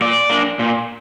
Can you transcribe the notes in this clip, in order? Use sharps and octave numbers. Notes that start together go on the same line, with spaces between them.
A#2 D5
A#3 D4
A#2